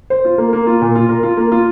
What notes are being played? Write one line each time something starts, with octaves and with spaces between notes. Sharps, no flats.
C5
F4
A#3
A#3
F4
A#2
F4
A#4
F4
A#3
F4